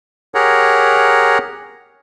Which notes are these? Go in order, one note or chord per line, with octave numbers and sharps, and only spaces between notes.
G4 G#4 A#4 C#5 F#5 A#5